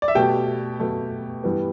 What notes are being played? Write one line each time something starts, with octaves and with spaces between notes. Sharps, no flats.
D5
E5
B2 A3 G4 G5
B2 A3
G2 E3 G3 B3